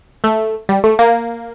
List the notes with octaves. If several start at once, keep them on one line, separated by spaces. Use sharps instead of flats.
A3
G3
A3
A#3